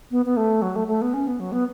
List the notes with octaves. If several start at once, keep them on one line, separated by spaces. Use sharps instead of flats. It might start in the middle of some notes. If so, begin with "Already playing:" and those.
B3
B3
A3
F#3
A3
A3
B3
C#4
B3
F#3
B3